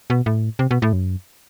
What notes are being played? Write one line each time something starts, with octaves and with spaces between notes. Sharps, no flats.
B2
A2
C3
B2
A2
F#2